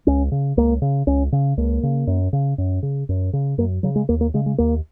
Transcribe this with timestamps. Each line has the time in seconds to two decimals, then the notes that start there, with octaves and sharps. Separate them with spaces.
0.07 C#2 C#4
0.32 C#3
0.57 C#2 A#3
0.82 C#3
1.07 C#2 C#4
1.32 C#3
1.57 C#2 A#3
1.83 C#3
2.07 F#2
2.33 C#3
2.58 F#2
2.83 C#3
3.09 F#2
3.33 C#3
3.58 F#2 A#3
3.83 C#3 F#3
3.96 G#3
4.09 D#2 A#3
4.21 A#3
4.34 C#3 G#3
4.46 G#3
4.58 D#2 A#3